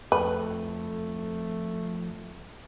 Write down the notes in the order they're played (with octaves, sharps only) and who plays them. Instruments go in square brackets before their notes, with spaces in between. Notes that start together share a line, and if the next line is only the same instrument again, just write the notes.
[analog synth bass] F2 [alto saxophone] A3 [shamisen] B4